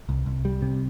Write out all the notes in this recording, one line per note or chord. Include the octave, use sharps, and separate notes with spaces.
C2
C2
G3
C3